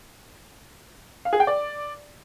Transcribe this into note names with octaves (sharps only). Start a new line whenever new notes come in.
F5
G#4
G5
D5